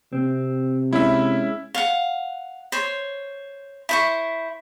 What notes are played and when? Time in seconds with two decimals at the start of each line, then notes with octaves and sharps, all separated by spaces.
0.13 C3 C4
0.93 G#3 C#4 E4 E5
1.75 F5 F#5
2.72 C5 C#5
3.89 E4 C5 C#6